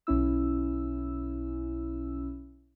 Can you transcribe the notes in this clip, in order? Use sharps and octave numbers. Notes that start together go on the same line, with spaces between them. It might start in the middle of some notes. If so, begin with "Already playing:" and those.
B1 C#4 E4 E6